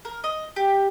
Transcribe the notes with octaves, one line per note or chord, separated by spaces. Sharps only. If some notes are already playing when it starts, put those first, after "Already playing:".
A#4
D#5
G4